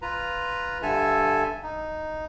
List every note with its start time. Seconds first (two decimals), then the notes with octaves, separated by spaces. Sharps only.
0.02 F4 B4 A#5
0.82 G2 D3 A4 E5 G#5
1.63 D#4